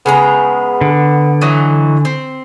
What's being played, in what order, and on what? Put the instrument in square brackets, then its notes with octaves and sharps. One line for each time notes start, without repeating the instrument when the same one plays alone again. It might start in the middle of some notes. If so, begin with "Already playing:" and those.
[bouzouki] C#3 G#3 A#5 [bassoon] B3
[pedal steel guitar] D3
[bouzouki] E3 F#3 D#4
C4